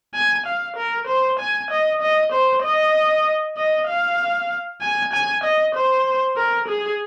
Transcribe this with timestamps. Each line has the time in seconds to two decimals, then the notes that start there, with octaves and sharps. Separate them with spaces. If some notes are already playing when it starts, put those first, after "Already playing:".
0.14 G#5
0.47 F5
0.77 A#4
1.08 C5
1.40 G#5
1.71 D#5
2.02 D#5
2.32 C5
2.63 D#5
3.57 D#5
3.88 F5
4.82 G#5
5.13 G#5
5.44 D#5
5.75 C5
6.37 A#4
6.69 G#4